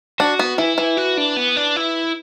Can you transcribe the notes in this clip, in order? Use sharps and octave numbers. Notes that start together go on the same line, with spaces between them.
D4 F#4
B3
E3 E4
E3
F#4
D4
B3
D4
E4